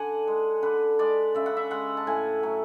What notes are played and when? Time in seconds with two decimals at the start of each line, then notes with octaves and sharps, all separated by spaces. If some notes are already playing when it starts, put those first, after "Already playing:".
Already playing: D3 F#5 G#5
0.27 G#3
0.62 D3 B4
0.99 G#3 D5
1.35 C#3 E5
1.46 F#5
1.57 E5
1.71 G#3 F#5
1.97 A5
2.07 A2 G#5
2.43 F#3 A3